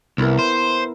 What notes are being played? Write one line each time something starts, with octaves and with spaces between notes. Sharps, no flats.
C2 B3 E4 A#4
C5